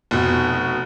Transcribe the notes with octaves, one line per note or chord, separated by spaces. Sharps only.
F1 B2